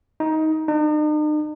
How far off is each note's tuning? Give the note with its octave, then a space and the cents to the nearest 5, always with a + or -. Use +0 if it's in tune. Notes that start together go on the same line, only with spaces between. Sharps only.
D#4 +15
D#4 -45